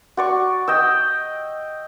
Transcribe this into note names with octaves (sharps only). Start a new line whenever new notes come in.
F#4 D5 C#6
D#5 G5 E6